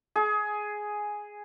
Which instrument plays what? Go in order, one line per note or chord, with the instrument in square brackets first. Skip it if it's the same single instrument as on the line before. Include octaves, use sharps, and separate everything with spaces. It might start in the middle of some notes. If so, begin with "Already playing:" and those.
[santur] G#4